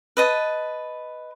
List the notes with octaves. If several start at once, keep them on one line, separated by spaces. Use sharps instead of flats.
B4 D#5 A5